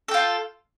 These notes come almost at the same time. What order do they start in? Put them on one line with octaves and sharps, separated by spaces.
A4 G5 F4